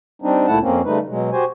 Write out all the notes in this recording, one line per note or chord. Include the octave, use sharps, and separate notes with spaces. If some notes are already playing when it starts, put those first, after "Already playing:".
G3 C4 D4 D#4
D2 A#2 A3 E4 F#5 A5
F2 A#3 C4 C#4
C#3 G3 A3 D#4 B4
B2 F#3 G#3
F#4 G4 C5 G#5